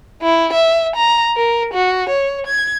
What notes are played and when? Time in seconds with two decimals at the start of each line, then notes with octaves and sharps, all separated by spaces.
0.22 E4
0.53 E5
0.96 A#5
1.37 A#4
1.74 F#4
2.10 C#5
2.47 G#6